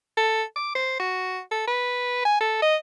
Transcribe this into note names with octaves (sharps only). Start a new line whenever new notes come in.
A4
D6
C5
F#4
A4
B4
G#5
A4
D#5